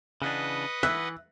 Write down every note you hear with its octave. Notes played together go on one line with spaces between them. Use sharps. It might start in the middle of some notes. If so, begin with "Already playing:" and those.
C#3 E3 D4 B4 D#5 F#5
E3 E5 F#6